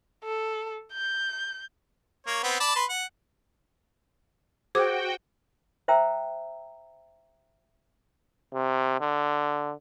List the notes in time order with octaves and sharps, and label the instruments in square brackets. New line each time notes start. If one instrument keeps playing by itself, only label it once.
[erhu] A4
G6
[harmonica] A#3 C#5
B3 C4
D5 A5 B5
B4 C6
F#5
[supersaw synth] F#4 G5 [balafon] G#4 C5 D6
[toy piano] C5 E5 G5 A#5 E6
[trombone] C3
D3